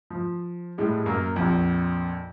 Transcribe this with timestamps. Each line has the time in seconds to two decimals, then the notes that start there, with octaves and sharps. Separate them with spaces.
0.11 F3
0.78 A2 G3 G#3
1.06 F#2 A#3 A#4
1.36 A#1 F2